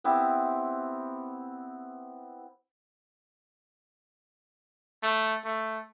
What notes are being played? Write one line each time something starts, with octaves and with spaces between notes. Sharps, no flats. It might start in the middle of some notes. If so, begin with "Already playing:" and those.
B3 C4 E4 G4
A3
A3